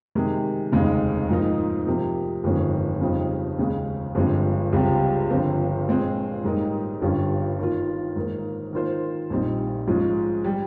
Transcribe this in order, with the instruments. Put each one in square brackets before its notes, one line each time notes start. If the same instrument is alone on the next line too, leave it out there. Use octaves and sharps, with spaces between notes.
[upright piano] C3 D#3 G#3
F1 D#2 C#3 G#3 D#4
G#2 F3 A#3 D#4
C3 F3 A#3
G1 F2 D#3 G#3 C#4
F2 C#3 G3 C4 D#4
D#2 C#3 G#3
G1 G2 F3 G#3 C4
C#2 C3 G3 C4 F4
G1 G2 F3 C4
A#2 G#3 C4
G#2 G3 A#3 D#4
G1 G2 G3 C#4 F4
D#3 A#3 F4
G#2 D#3 A#3
D#3 A#3 F4 C5
A#1 A#2 G3 C4 D#4
G#2 F3 G#3 C#4 F4
G3